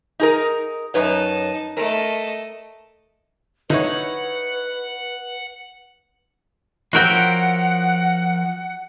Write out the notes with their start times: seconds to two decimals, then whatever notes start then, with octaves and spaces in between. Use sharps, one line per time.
0.20 D#4 G#4 A#4
0.94 F#2 D#4 B4 C#5 A5
1.77 A3 A#4 D#5
3.70 D3 D#4 E4 B4 C#5 F#5
6.93 F3 F#4 A#4 C#5 E5 F#5 G5